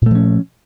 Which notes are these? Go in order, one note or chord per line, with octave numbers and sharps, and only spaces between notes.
A#2 F3 A3 C#4